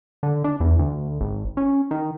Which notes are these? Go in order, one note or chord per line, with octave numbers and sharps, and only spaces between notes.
D3
D4
E2
D2
G#1
C#4
D#3